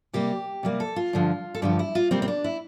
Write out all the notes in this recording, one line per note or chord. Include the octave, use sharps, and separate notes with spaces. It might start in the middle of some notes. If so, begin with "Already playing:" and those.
C3 G3 A#3 G4
C3 G3 A#3
A4
F4
G2 D3 F3
A4
G2 D3 F3 G4
E4
F4
C3 G3 A#3 C4
C4
D4
E4